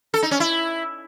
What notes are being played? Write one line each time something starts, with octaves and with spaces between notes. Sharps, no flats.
A4
D#4
C#4
E4